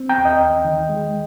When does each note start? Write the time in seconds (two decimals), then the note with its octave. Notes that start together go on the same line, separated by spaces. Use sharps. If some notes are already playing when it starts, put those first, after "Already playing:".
Already playing: C4
0.09 G5 A#5
0.18 D#2
0.25 D#5 G5
0.41 D#2
0.65 D#3
0.89 G#3